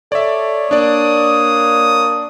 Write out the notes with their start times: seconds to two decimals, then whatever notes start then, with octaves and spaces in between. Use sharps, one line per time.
0.12 A4 C#5 D5 E5
0.71 A#3 D4 D5 D#6